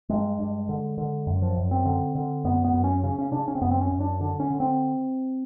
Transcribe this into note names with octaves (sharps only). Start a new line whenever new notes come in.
G2 G#3
G2
D3
D3
F#2
F3
F#2
C4
D3
D3
F#2 B3
B3
F#2
C#4
C#3 C#4
C#4
C#3 D4
C#4
C4
F#2 B3
C4
C#4
F#2
D4
D3 D4
C#4
D3
C4